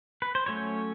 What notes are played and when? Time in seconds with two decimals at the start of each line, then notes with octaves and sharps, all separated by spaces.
0.22 B4
0.35 C5
0.46 F#3 A3 C#4 C#5